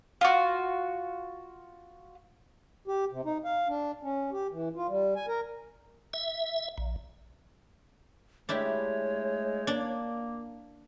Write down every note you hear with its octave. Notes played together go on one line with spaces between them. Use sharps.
F4 F#4
G4
C3
D#4
F5
D4
C#4
G4
E3
F4
G3
G#5
A#4
E5
A#1
G#3 A3 D4 E4 G4 C#5
A#3 D4